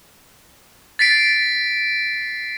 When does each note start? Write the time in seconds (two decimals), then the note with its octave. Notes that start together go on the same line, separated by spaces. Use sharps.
0.99 A6 B6 C7 D7